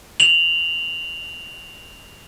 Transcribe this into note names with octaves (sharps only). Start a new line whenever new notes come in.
F7 F#7